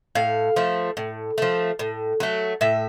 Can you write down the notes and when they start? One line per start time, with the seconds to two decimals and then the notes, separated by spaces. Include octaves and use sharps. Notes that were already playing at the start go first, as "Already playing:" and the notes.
0.15 A2 F5
0.56 F3 A3
0.97 A2
1.38 F3 A3
1.79 A2
2.20 F#3 A3
2.61 A2 E5